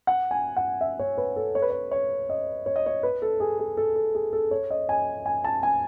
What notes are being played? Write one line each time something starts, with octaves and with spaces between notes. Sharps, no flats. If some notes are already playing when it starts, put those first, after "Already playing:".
F#5
G#5
F#5
E5
C#5
B4
A4
C#5
B4
C#5
C#5
D#5
C#5
D#5
C#5
B4
A4
G#4
G#4
A4
A4
G#4
A4
C#5
D#5
G#5
G#5
A5
G#5